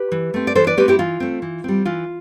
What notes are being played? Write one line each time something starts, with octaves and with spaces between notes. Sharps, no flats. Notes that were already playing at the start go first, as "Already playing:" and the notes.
Already playing: G4 B4
E3
A3 C4
D5
E3 A4 C5
B4 D5
A3 C4 G4 B4
E4 G4
E3 F4
A3 C4
E3
G3 C4
E3 F4